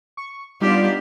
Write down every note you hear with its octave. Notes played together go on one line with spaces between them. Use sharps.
C#6
G3 B3 D4 D#4 F4 G4 D5